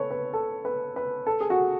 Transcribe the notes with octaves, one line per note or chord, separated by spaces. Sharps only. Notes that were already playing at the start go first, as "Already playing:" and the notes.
Already playing: A4 B4 C#5
B4
A4
B4
B4
A4
G#4
F#4